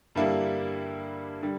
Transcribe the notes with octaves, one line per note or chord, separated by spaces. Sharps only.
G2 D3 G3 A#3 E4
D3 G3